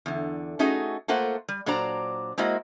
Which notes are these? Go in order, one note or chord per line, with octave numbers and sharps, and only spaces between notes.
E2 D3
A3 C#4 D#4 F#4 G#4 D#5
A3 A#3 F4 C5 F#5
G3
A#2 F#3 D4 C5 D5 A#5
G#3 A#3 E4 F#4 C5 D#5